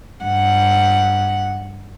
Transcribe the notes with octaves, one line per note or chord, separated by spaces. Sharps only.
G2 F#5